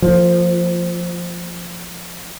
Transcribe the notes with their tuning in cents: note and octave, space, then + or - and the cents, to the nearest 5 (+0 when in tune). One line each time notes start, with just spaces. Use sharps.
F3 +0 A#3 -40